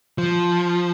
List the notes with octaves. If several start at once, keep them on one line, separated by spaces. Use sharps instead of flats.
F3